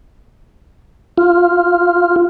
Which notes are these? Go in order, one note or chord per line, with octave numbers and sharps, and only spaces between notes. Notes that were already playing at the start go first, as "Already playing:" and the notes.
F4